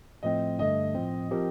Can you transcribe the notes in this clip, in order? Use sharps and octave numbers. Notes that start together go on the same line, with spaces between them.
A2 F3 A3 C4 D#5
G2 D3 A3 D#5
A2 F3 C4
F3 C4 G4 A#4